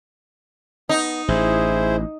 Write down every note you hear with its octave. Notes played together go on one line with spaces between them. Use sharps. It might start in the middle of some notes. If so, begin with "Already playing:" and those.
B3 D#4
A1 E4 G#4 C5